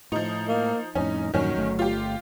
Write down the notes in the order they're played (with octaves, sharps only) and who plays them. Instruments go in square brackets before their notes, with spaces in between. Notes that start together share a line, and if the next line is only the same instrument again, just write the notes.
[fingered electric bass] A2 [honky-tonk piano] F3 D#4
[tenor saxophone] A#3
[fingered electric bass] F2 A2 [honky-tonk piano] C#4 [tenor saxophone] D#4
[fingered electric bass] E2 G2 A#2 [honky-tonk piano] D#3 C#4 [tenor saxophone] F#3
[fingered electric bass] G1 A3
[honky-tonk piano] F4 G4